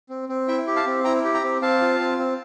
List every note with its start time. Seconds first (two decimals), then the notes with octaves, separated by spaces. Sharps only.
0.09 C4
0.29 C4
0.48 E4 E5 G5
0.67 G4
0.76 F5 A5
0.86 C4
1.04 E4 G5 A#5
1.25 G4
1.34 G5 A#5
1.44 C4
1.62 C4 F5 A5
1.81 F4
2.00 C4
2.19 C4